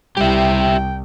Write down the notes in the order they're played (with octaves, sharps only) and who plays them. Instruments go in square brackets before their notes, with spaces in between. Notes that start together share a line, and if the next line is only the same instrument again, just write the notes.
[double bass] C2 [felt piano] G3 E4 [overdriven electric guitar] G4 E5 [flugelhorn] G5